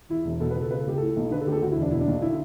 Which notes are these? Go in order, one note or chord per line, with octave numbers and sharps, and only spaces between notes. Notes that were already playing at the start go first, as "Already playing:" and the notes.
E2 E4
E1
B2 A4
B4
C#2
A4
C#3 B4
A4
C#2 G4
A2 A4
B1
D3 B4
A4
D2 G4
A4
G4
D2 F#4
E4
E1
D4
B2 E4
D4
B1
D3 E4